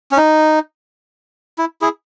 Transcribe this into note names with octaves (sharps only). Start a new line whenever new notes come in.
C#4
D#4
E4
E4 G#4